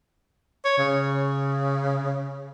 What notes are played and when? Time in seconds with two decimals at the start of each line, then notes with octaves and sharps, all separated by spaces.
0.65 C#5
0.78 C#3